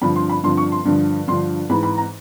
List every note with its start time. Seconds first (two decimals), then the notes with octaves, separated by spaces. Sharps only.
0.02 G2 D3 F3 B5
0.16 C6
0.29 B5
0.43 G2 D3 F3 C6
0.57 C#6
0.72 C6
0.85 G2 D3 F3
1.27 G2 D3 F3 C6
1.69 G#2 E3 B5
1.83 B5
1.98 A#5